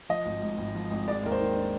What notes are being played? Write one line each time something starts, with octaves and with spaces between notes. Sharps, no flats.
F3 D#5
G#1
G#2
G#1
F3
G#1
G#3 D5
D#2 A#4
C5
D#3
D4